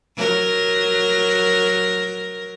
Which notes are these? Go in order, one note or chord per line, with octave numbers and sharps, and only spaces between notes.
F#3 A#4